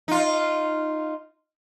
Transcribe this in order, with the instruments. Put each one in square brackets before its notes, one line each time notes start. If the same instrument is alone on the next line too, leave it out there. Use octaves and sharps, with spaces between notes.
[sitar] D#4 F4